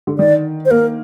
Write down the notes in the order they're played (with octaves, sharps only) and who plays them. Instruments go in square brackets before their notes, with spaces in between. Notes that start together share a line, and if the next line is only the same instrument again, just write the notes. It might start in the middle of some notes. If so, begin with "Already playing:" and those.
[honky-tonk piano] D3
[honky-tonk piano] D#3 [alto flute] D5
[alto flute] C5
[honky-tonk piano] A#3 [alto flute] A#4